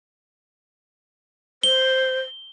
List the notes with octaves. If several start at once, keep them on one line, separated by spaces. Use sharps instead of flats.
C5 G7